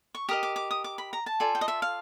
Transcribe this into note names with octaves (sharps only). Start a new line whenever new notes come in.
C#6
G4 A#4 D#5 D#6
D6
D6
D#6
D6
B5
A#5
A5
F4 A4 D5 G#5
G5
D#5
E5
F5